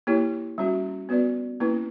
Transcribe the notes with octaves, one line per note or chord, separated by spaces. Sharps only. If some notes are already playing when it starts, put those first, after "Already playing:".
A#3 E4 G4 C#5
G3 C#4 F#4
B3 F#4 B4 D5
A#3 C#4 E4 B4